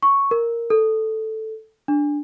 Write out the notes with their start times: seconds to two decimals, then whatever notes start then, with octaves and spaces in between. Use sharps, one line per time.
0.03 C#6
0.31 A#4
0.70 A4
1.88 D4